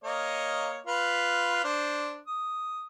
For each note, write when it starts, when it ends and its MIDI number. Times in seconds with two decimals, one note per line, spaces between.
0.04 0.78 58
0.04 0.78 73
0.04 0.78 75
0.87 1.61 65
0.87 1.61 71
1.64 2.19 62
1.64 2.19 72
2.27 2.87 87